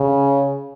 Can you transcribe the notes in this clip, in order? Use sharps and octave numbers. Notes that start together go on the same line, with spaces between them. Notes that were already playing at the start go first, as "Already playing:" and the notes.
Already playing: C#3